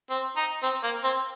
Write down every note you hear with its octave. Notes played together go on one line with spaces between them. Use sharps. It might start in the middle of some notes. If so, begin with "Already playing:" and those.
C4
D#4
C4
A#3
C4